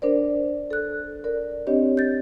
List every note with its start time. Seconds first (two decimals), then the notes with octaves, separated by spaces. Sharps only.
0.02 D4 A#4 C5 D5
0.71 A4 F#6
1.24 A#4 D5
1.67 C4 D4 G4 C#5 D#5
1.97 G6 A6